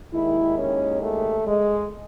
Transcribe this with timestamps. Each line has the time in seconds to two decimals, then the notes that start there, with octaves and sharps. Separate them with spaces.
0.12 D#2 D#3 G#3 E4
0.58 C#4
1.02 A3
1.47 G#3